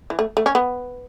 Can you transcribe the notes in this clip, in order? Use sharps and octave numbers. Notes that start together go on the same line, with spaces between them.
E3
A3
A3
C#4
B3